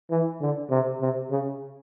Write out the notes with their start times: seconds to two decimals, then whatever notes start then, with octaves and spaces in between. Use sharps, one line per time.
0.10 E3
0.41 D3
0.70 C3
1.01 C3
1.31 C#3